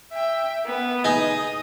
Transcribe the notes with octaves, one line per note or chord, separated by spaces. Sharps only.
E5 G5
B3
D#4 G#4 D#5 D#6